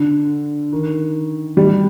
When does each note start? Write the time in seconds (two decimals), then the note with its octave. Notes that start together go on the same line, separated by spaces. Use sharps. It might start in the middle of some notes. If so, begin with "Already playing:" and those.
Already playing: D3
0.73 D#3
1.57 G3